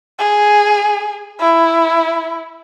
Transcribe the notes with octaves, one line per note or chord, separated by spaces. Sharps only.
G#4
E4